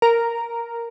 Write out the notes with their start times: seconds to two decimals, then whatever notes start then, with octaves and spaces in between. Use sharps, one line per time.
0.02 A#4